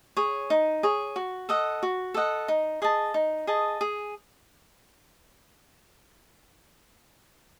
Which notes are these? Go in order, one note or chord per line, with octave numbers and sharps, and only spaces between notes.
G#4 C#5
D#4
G#4 C#5
F#4
A4 D#5 F#5
F#4
A4 D#5 F#5
D#4
G#4 D#5 A5
D#4
G#4 D#5 A5
G#4